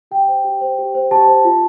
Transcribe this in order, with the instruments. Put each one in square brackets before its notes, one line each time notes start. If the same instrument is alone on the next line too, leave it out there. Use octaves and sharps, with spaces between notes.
[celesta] G4 G5
C5
G4
C5
G4
C5
G4 A5
C5
F4